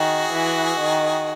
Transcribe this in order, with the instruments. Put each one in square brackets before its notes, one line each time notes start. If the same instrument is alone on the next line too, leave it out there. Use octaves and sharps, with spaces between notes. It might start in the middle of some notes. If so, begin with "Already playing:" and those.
Already playing: [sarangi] D#3 [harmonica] F#4 G#4
[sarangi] E3
D#3